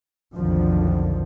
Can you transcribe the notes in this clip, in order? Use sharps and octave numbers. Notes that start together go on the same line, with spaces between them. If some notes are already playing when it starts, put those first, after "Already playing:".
B1 F2 D3 D#3 F3